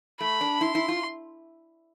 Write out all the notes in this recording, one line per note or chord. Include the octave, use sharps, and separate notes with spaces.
A3 B5
D4
E4 C6
E4
F4